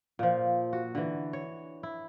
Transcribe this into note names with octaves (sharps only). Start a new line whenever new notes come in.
A#2 F3
F#4
D3 E3
C#5
E4